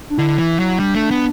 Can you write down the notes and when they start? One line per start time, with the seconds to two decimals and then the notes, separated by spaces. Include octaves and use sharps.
0.10 D4
0.18 D3 E4
0.38 E3
0.59 F#3
0.80 G3 D4
0.95 A3
1.11 B3